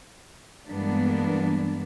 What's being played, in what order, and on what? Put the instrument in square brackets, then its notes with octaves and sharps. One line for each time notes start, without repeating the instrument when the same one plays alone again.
[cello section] G2 E3 G#3 A#3 B3 D4